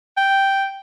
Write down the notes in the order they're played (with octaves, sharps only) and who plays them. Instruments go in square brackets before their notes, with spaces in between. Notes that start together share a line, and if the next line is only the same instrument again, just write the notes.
[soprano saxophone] G5